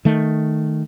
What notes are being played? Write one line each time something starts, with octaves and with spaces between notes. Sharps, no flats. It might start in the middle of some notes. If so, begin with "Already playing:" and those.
D#3 A3